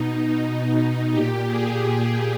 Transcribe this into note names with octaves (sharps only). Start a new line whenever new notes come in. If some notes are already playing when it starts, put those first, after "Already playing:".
Already playing: B2 D#4
A#2 G4
G#4
G4